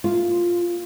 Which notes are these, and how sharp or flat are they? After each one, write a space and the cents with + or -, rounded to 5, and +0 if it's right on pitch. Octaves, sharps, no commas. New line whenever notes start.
A#3 +0 F4 +0